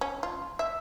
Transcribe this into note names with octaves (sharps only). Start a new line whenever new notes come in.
C#4
F4
E5